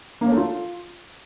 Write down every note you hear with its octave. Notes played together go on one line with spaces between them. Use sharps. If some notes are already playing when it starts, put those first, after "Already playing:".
A#3
C#4
A3
F4